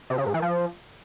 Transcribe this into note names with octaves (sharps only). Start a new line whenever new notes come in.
C3
C#3
G#2
E3
F3